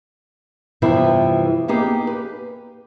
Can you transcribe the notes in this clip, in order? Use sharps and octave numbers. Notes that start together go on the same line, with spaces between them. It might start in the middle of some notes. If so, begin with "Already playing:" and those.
G2 C3 E3 F3 B3 E4
A#3 B3 D#4 G4 G#4
B4